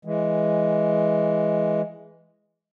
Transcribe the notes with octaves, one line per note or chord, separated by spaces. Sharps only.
E3 G#3